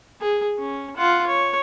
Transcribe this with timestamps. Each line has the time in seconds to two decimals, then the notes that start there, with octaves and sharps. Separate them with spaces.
0.21 G#4
0.59 C#4
0.97 F4 F#5
1.27 C#5